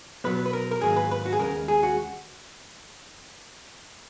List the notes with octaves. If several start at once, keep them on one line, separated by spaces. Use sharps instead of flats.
B2 F#3 B3 B4
B4
A#4
A#4
G#2 D#3 F#3 A#3 G#4
B4
B4
F#4
G#4
D#2 C#3 G#3 A#4
G#4
F#4